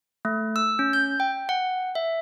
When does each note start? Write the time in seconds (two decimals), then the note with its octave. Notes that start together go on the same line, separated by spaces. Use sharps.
0.25 A3
0.56 E6
0.79 C#4
0.93 G6
1.20 G5
1.49 F#5
1.95 E5